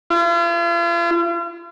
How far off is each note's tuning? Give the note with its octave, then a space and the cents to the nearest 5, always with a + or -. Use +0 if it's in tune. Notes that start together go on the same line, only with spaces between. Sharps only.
F4 -45